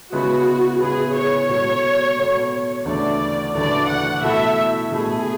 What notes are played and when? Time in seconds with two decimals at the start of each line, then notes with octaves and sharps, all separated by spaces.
0.12 C#3 G#3 B3 E4 F#4 B4
0.80 C#3 G#3 B3 E4 G#4 B4
1.15 C#5
1.48 B2 G#3 B3 F#4 A4
2.18 B2 G#3 B3 F#4 A4
2.85 D2 C#3 E3 A3 D5
3.54 D2 C#3 E3 A3 D5
3.88 F#5
4.22 B2 A3 E4 A4 E5
4.91 B2 A3 E4 G#4 A4